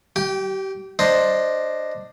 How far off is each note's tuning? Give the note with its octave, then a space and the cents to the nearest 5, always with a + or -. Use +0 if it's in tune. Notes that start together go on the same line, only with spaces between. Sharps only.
G4 -30 G5 +0
D4 +10 C5 +0 D#5 +0